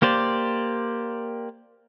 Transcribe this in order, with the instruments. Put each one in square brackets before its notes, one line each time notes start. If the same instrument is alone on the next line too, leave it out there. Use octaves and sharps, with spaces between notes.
[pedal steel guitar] A#3 G4 C5 D5